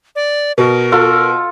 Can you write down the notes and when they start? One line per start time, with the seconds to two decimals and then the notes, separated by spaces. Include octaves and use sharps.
0.16 D5
0.58 B2 A#4
0.92 F4 A4